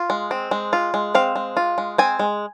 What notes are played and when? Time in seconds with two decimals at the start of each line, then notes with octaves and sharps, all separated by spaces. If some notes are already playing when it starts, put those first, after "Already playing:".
Already playing: F4
0.10 G#3
0.31 C4
0.51 G#3
0.73 F4
0.94 G#3
1.15 C4 F5
1.36 G#3
1.57 F4
1.78 G#3
1.98 C4 G#5
2.19 G#3